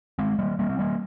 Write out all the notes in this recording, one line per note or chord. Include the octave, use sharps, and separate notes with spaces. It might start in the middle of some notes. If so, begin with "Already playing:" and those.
G#3 C4
G3 A#3
G3 A#3
C4
G3 A#3